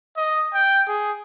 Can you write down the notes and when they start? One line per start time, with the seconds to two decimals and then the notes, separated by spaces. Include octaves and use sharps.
0.17 D#5
0.54 G5
0.88 G#4